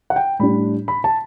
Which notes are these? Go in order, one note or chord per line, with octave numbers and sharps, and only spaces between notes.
F#5
G5
A2 G3 D4 B5
B5
A5